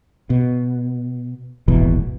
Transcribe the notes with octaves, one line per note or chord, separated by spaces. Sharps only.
B2
D#1 G#1 B2 E3